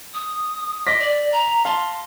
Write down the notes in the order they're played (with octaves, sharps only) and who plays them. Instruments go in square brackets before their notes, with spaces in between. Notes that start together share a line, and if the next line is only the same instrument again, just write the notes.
[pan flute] D#6
[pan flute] D#5 [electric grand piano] D6 A#6 B6
[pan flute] D5
A#5
[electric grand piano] F5 A5 [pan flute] C6